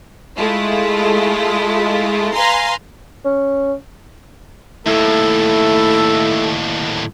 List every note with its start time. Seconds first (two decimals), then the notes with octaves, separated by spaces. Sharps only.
0.37 G#3 A3 E4 F4
2.33 B4 F5 G#5 A#5 C6
3.25 C#4
4.86 D#2 A2 A3 E4 A4